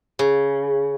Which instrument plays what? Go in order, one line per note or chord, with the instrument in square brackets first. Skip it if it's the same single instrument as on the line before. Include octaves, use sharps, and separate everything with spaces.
[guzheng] C#3